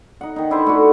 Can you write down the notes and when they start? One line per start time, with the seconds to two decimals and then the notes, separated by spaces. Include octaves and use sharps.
0.21 D#4 F#5
0.36 D#3 D#4
0.50 D4 E4 B4 C5
0.66 A3 D#4 E4 F#4